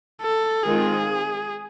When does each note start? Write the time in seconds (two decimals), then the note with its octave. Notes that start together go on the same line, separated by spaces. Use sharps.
0.22 A4
0.63 D#3 G#3 C4 F4 G#4